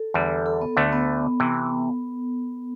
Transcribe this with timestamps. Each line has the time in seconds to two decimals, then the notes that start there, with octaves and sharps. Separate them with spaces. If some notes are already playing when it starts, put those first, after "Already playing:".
Already playing: A4
0.14 E2 D3 G3
0.46 A4
0.61 B3
0.77 D2 D3 A3
0.92 B3
1.40 C3 E3